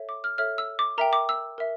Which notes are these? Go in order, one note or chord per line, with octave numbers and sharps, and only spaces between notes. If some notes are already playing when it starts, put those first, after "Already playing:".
Already playing: A4 C#5 E5
D6
F6
A4 C#5 E5 F6
E6
D6
A#4 E5 G5 A#5
D6
E6
A#4 E5